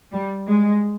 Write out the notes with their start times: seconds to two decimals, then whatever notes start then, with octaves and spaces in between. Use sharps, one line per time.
0.12 G3
0.46 G#3